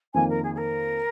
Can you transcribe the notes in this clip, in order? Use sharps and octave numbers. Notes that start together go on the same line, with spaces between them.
F2 D#3 A#3 G#5
A#4
G#4
G#4
A#4